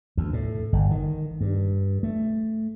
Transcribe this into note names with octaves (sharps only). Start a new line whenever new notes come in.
D2
A2
G1
D#3
G2
A3